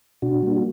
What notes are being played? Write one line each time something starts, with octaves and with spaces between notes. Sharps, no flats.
B2 D4 F#4
G3 A#3
F#4